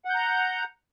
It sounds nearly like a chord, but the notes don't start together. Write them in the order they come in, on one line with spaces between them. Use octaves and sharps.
F#5 G6 A#5